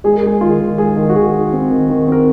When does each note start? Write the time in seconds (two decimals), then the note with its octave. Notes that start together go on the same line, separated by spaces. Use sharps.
0.04 G#3 G#4
0.15 A#4
0.23 G#3 G#4
0.41 D#3 F4
0.60 D#3
0.78 G#3 G#4
0.97 D#3
1.09 F#4
1.15 D#3 G#4
1.34 D#3
1.53 C4
1.70 D#3
1.89 D#3
2.07 C4 A#4